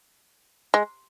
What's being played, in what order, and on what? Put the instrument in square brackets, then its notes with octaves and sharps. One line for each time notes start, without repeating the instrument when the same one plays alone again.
[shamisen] G#3